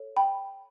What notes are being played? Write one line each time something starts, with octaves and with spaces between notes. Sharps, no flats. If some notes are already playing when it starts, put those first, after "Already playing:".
Already playing: A4 C#5
G5 B5